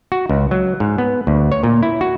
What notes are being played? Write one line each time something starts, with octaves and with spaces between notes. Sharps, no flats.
F#4
C#2
F#3
G#2
B3
D2
C#5
A#2
E4
F#4